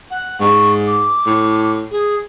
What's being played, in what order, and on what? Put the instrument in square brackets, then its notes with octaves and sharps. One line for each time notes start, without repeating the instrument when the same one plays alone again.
[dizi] F#5
[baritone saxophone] G#2 [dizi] C#6
[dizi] D6
[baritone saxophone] A2
[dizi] G#4